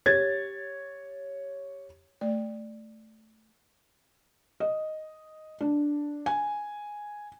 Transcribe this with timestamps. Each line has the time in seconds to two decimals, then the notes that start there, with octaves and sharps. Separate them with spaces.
0.06 G4 C#5 G#6 A6
2.21 A3 D5
4.60 D#5
5.61 D4
6.26 G#5